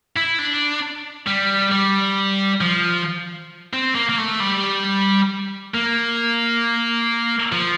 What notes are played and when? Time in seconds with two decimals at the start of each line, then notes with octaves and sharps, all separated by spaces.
0.16 E4
0.39 D4
1.27 G3
1.71 G3
2.61 F3
3.73 C4
3.95 A#3
4.09 A#3
4.18 A3
4.40 G3
5.75 A#3
7.52 F3